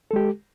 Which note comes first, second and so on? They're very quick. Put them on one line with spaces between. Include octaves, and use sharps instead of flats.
A4 G#3 G4